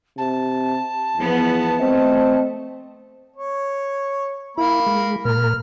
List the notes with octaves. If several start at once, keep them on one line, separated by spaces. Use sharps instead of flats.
C3 A5
E2 F3 B3
A3 C4 D#5
C#5
A#3 E4 B5
G#3
A#2 A#4 F6